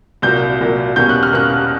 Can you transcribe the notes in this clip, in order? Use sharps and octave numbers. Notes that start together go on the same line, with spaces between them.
C2 A#2 F#3 A#3 G6
C2 A#2 F#3 A#3
E2 B2 G3 A#3 C#4 G6
F#6
F6
E2 B2 G3 A#3 C#4 F#6